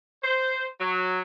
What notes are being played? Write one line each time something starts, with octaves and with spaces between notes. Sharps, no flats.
C5
F#3